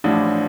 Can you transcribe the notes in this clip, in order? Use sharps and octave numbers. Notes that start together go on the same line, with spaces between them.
A1 A2 F3 D4